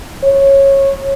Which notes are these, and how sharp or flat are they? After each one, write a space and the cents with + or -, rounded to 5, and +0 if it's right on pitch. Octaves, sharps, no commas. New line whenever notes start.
C#5 -15